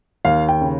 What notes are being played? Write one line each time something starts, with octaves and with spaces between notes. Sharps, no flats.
D#2 F5
G5
C#3